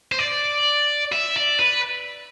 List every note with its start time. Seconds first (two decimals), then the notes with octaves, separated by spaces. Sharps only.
0.12 C5
0.19 D5
1.13 E5
1.36 D5
1.59 B4